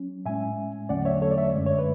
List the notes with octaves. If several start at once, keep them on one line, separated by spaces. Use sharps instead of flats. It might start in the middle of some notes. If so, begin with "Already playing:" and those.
Already playing: F#3 C#4
A2 G#3 C#4 E5 G#5
E2 D3 F#3 A3 C#4 D5 F#5
C#5 E5
A4 C#5
D5
C#5 E5
F#2 D3 G#3 D5
C#5
B4